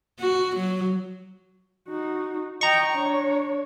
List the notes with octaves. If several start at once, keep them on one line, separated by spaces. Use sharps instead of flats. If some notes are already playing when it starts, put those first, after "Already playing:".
F#4
F#3
D#4 F#4
D#5 G5 A#5 C#6
D4 C#5